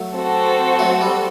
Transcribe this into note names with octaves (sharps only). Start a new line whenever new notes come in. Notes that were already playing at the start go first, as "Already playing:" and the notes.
Already playing: F#3 A3
C4 F#4 A4
F#3 A3
G3